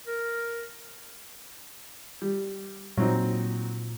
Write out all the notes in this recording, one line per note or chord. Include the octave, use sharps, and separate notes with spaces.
A#4
G3
A#2 F#3 C4 D#4